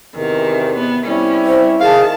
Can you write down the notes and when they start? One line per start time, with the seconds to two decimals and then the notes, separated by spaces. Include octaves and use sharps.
0.16 E2 C3 D#3
0.78 B3
1.06 G3 C4 C#4 E4
1.45 C5
1.81 D#3 G#4 F5 A5